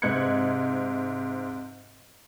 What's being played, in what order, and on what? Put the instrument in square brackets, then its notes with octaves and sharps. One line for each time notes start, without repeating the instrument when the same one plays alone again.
[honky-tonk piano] G#2 C3 F#6 G#6 C#7